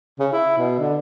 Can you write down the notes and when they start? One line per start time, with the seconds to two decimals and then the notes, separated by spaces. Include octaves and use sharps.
0.19 C#3
0.33 E4
0.58 B2
0.79 D3